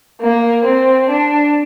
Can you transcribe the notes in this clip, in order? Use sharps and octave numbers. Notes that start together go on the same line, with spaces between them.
A#3
C4
D4